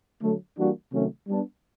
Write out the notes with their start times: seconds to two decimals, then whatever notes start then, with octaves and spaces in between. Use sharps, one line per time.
0.22 D3 F#3 A3
0.57 E3 G3 A#3 D4 F#4
0.92 C3 D#3 F#3 A3 C#4
1.27 G3 B3 D4